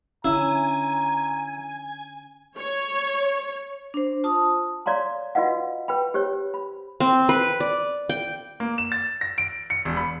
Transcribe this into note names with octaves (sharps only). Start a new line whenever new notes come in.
D3 C#4 E4 E5 G#5 A#5
C#5
D4 C5
F4 A5 D#6
C#5 D5 F5 A#5 C6
F4 F#4 B4 D#5 F5 F#5
B4 G5 B5
G4 C5 C#5
B5
C4
B4
D5
G5
A#3
E7
A6
A#6
D7
C#7
E1
B5